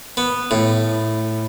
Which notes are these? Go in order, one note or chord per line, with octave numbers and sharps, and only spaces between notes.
B3
A2